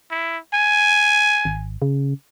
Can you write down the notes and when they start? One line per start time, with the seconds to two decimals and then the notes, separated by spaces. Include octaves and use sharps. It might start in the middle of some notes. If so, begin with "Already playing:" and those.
0.11 E4
0.54 G#5
1.45 G#1
1.82 C#3